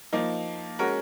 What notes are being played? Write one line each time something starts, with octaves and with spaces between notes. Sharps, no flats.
F3 A#3 D#4
G#3 C#4 F#4 A#4